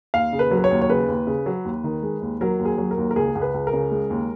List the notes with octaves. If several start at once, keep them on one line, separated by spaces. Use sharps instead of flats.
D#2 F5
C#3
B4
F#3
B4
C#5
D#2
C#5
C#3 B4
D#2
C#3
F#3
D#2
D#3
G#3
D#2
F#3 A#4
D#2
G#4
F#3
A#4
D#2
A#4
C#2 G#4
C#2
B4
C#2
A#4
C#3
G#3
D#2